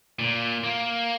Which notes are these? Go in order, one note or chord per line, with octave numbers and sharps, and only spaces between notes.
A#2
A#3